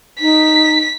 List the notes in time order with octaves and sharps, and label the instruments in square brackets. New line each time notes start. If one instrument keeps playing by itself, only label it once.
[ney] D#4 [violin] B6